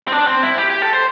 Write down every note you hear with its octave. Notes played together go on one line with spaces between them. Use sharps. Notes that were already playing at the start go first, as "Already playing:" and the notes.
C4
D4
C4
E4
G4
G4
A4
C5